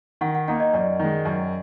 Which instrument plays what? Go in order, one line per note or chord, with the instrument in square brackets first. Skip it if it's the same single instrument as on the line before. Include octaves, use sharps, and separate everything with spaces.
[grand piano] D#3 [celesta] F#5
[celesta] F#5
[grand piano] A#3 D#4 [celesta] F#5
[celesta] D#5
[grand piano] F#2 [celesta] D5
[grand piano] D#3 G#3
F#2